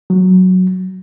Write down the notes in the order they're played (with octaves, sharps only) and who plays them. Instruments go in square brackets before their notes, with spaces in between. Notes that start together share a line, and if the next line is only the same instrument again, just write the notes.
[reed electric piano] F#3